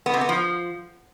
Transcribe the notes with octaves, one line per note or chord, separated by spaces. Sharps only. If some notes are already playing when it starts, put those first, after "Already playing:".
B3
C3
B3
F3